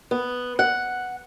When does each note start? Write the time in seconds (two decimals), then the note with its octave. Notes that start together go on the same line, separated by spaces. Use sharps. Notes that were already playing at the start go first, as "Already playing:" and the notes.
0.11 B3
0.59 F#5